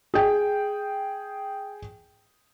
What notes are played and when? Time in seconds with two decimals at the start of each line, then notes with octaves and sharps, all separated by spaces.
0.14 G#4 G5